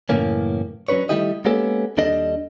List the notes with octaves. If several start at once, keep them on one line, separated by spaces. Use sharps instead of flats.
F#2 A2 C#3 E3 A#3 C#4
F#3 C#4 D4 B4 C#5
D#3 G3 A3 E4 G4 D#5
G#3 A#3 B3 C#4 G4 A4
D#2 G3 D4 A4 D#5